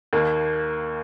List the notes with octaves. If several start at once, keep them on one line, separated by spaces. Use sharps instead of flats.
D#2 D#3 A#3